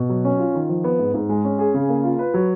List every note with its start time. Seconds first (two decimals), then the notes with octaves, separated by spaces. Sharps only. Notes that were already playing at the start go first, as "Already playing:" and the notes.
Already playing: B2
0.09 F#3
0.25 C#4
0.39 F4
0.54 D#3
0.69 F3
0.84 B3
0.99 G#2
1.14 G#2
1.29 G#3
1.44 C#4
1.59 G#4
1.74 C#3
1.89 A#3
2.04 F4
2.19 B4
2.34 F#3